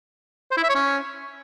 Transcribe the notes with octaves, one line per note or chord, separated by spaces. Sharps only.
C5
E4
E5
C#5
C#4